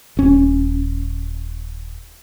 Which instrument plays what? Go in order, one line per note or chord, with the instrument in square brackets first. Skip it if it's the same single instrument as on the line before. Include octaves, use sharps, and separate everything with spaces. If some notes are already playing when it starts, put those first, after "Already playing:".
[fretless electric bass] D#1 C#4